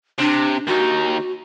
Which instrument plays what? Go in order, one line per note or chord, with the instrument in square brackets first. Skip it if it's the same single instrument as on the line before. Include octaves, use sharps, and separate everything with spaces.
[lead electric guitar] C3 [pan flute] D4
[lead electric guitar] D#2 D#4 [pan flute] F#4